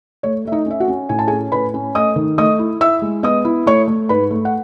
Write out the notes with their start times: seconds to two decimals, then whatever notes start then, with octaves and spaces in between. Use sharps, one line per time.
0.23 A3 C#5
0.45 A3 E5
0.52 D#4 D#5
0.66 C#4 E5
0.80 F#4 F#5
0.88 C#4
1.09 A2 G#5
1.19 A5
1.27 G#4 G#5
1.31 C#4
1.52 A2 B4 B5
1.74 C#4
1.95 A3 D#5 D#6
2.16 D#3
2.38 A3 D#5 D#6
2.59 E4
2.81 E4 E5 E6
3.02 G#3
3.23 B3 D#5 D#6
3.45 E4
3.66 A3 C#5 C#6
3.88 A3
4.09 G#2 B4 B5
4.31 A3
4.45 F#5